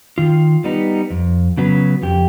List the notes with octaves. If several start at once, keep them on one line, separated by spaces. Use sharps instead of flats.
D#3 F4
G3 B3 D#4
F2
C#3 F#3 B3
F2 G4